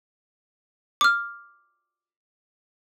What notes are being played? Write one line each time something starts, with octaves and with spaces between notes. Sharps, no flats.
D6 F6